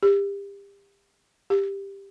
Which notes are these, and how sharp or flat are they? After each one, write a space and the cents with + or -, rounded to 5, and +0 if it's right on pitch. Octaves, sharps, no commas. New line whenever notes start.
G4 +30
G4 +10